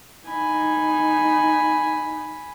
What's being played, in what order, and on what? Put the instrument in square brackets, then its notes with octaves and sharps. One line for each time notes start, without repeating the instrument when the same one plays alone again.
[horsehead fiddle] D#4 [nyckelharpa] G#5 B5